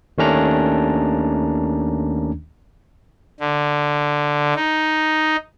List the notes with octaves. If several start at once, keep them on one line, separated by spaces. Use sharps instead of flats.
D#2 D#3 A3 C#4 D4 A#5
D3
D#4